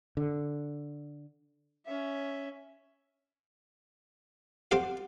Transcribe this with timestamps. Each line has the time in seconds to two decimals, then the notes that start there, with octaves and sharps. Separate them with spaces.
0.17 D3
1.86 C#4 E5
4.71 C4 G4 F5 F#5